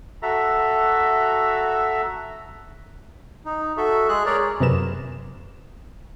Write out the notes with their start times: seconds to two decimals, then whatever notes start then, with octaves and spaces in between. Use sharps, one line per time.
0.22 F#4 A4 E5 A#5
3.45 D#4
3.77 F#4 A4 E5
4.09 G#3 G#4 F#6
4.26 G#4 A#4 C#5 D5
4.60 F#2 C3 B3 A#4 B4 E7